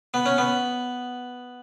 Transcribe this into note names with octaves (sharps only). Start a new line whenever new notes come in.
B3
C#4
B3